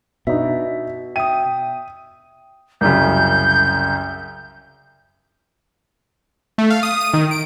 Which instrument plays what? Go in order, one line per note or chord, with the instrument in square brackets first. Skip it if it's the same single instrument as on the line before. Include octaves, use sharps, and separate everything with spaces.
[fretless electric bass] B2 [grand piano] D4 D#4 [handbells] E5
[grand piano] E5 D#7 [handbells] G5 D#6
[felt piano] C2 F#2 C#3 [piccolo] G6
[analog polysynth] A3
F5
D#6
D#7
D#3
D7